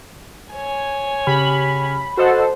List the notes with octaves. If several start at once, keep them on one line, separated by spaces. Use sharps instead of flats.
C#5 G#5
C#3 G4 B5 F6
F#4 A4 C5 D#5 F#5